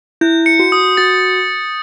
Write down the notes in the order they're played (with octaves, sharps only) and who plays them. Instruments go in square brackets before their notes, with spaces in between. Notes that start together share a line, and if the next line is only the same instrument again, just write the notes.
[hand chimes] E4 [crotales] G6
[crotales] C#7
[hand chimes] F#4
[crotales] D#6
[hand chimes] F#4 [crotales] A6